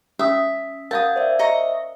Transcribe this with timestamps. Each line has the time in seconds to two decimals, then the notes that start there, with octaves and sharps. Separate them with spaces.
0.19 C#4 E5 D#6
0.91 A#4 F5 F#5 A5 D#6 G6 G#6
1.16 C5 D5 E5
1.39 D#5 A#5 C#6